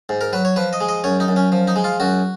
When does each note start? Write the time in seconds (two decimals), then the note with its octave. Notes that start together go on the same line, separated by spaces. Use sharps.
0.09 G#2
0.21 A#4
0.33 F#3 B4
0.45 C#5
0.56 F3 B4
0.73 D#5
0.81 G#3
0.89 D#5
1.04 F#2 C#5
1.20 D#4
1.28 F#2
1.36 C#4
1.52 F3
1.67 D#4
1.76 G#3
1.84 F4
2.00 F#2 F#4